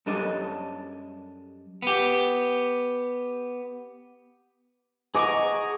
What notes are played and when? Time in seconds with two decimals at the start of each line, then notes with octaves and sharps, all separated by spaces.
0.06 F#2 G3 D4 A4 D#5
1.82 B3 G4
5.15 G#4 D#5 F#5 A#5 C#6 D6